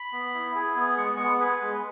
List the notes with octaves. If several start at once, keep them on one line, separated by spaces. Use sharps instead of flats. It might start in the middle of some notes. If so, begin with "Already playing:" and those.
Already playing: B5
B3
E4
G#4
B3
G#3 C#6
B3 C#6
G#4 B4
G#3